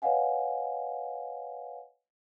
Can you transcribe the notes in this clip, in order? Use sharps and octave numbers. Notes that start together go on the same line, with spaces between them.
B4 C#5 D#5 F5 F#5 G#5